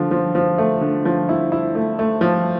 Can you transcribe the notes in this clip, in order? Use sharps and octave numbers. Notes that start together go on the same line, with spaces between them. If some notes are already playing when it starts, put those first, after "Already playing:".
Already playing: D3 F3
F3
F3
A3
D3
F3
E4
E4
A3
A3
F3